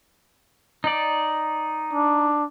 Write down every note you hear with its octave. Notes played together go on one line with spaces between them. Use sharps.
D#4 D5
D4